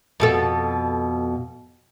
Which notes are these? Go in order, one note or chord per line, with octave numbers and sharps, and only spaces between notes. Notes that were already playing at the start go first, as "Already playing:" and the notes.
F2 B2 A4